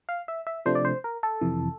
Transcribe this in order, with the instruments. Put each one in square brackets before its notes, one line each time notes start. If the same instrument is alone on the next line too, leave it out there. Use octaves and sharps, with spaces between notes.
[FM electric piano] F5
E5
E5
C3 F3 A3 D4 C5
D5
C5
A#4
A4
F2 C3 E3